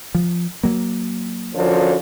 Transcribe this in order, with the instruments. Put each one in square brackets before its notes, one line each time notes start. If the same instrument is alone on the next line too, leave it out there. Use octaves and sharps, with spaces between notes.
[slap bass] F3
F#3 A#3
[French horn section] F#2 D3 F3